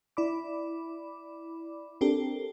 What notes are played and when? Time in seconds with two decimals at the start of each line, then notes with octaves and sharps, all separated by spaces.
0.17 E4 D5 B5 D6
2.01 C4 D4 G4 A4 A#4